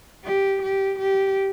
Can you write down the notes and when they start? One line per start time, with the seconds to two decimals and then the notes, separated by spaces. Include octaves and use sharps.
0.24 G4
0.62 G4
0.99 G4